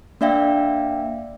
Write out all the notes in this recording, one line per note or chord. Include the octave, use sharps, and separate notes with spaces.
A#3 D4 D5 E5 F5 G5